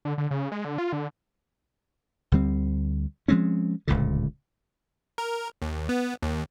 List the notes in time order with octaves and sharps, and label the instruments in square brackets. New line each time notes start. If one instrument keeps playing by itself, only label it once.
[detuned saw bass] D3
D3
C#3
G#3
D3
F4
D3
[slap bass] D2 D3 G3 C4
F3 G#3 C4 C#4
D1 C#2 A#2 D3
[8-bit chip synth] A#4
D#2
B3
D#2